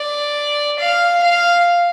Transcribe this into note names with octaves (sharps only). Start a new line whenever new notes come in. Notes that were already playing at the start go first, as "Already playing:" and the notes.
Already playing: D5
F5
F5